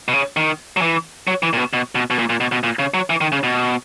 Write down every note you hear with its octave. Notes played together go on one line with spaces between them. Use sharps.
B2
C#3
D#3
F#3
E3
F#3
E3
A#2
B2
B2
B2
B2
A#2
A#2
B2
B2
A#2
C#3
F#3
E3
D#3
C#3
B2